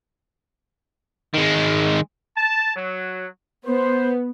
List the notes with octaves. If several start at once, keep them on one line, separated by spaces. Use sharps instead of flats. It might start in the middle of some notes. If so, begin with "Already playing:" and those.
D#3 G#3
A5
F#3
B3 C5